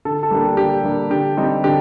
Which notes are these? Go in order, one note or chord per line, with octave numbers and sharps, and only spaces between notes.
D3 A4
A4
G3 A#3 D4
G4
D3 G4
G3 A#3 D4
D3 G4
G3 C4 D#4
D3 G4